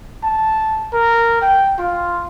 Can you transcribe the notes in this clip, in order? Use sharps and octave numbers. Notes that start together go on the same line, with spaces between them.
A5
A#4
G5
F4